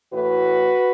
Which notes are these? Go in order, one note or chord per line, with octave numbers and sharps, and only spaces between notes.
A2 E3 A3 F#4 B4